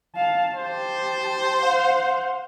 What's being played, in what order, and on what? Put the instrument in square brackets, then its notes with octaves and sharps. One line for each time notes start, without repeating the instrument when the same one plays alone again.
[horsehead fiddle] F5 A5
[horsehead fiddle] G4 A5 [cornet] C5
[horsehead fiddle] F5 F#5